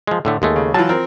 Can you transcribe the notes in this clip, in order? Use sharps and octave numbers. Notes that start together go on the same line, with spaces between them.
F3 G#3
A2 D3 A3
D#2 G#3 A3
C#3
E3 F#3 F4 A5
F3 C4 A#4